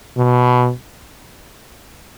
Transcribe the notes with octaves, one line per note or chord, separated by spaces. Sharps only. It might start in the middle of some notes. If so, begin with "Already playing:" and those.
B2